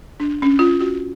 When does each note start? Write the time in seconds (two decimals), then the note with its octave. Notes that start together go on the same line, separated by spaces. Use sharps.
0.20 D4
0.42 C#4
0.59 F4
0.80 F#4